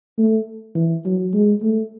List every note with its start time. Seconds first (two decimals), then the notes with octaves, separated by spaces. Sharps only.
0.18 A3
0.75 E3
1.05 F#3
1.34 G#3
1.62 A3